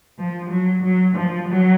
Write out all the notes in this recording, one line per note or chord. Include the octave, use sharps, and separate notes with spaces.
F3
F#3
F#3
F3
F#3